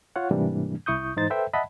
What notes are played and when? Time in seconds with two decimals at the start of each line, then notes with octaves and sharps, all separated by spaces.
0.16 F4 C#5 F#5
0.31 G#2 C3 E3 G3 A#3 D4
0.86 C2 E4 C#6 D#6 G6
1.16 G#2 E3 D#4 C5 A6
1.30 A4 B4 C5 E5 G5
1.54 D#5 E5 F#5 A5 B5